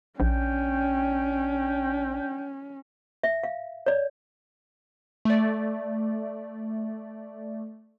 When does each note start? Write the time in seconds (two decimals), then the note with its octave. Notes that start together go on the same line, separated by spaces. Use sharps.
0.20 A#1 C#4 D4 G5
3.24 E5
3.43 F5
3.86 C#5 D5
5.25 A3 D5